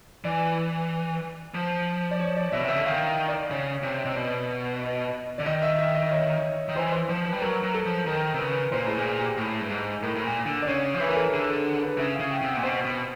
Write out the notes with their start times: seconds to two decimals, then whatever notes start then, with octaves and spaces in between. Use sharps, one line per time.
0.25 E3 D5
1.54 F3
2.11 D5
2.20 C#5
2.37 D5
2.52 B2 E5
2.61 C3
2.68 C#3 E5
2.77 D3
2.86 D#3 F5
3.28 D5
3.50 C#3 C#5
3.83 C3
4.04 C3 D#5
4.15 B2 D5
4.81 D#5
5.38 D3 D5
5.46 D#3 D#5
5.62 E5
5.79 E5
5.95 D#5
6.11 C#5
6.68 D#3
6.76 E3 C5
6.92 C5
7.09 F3 C5
7.26 B4
7.33 G3
7.42 F#3 A#4
7.63 F#3
7.74 A4
7.85 F3
8.06 D#3 A#4
8.34 C3
8.39 C#3 B4
8.72 A#2 C5
8.85 A2 G#4
8.98 A#2
9.05 G#4
9.21 G4
9.37 A2 G#4
9.61 G2
9.69 G#2
10.02 A2 A#4
10.15 A2
10.24 A#2
10.46 D3
10.62 D5
10.67 C#3 C#5
10.94 F3
11.00 E3 B4
11.09 A#4
11.16 A4
11.33 D3 G#4
11.49 A4
11.82 B4
11.98 C#3 E5
12.14 F5
12.20 C#3
12.31 G5
12.41 C3
12.47 F#5
12.56 A#2
12.63 B2 C5
12.85 B2